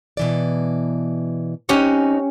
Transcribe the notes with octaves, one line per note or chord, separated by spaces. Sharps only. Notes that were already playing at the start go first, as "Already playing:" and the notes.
B2 E3 D5
C4 C#4 D#4 G4 F#5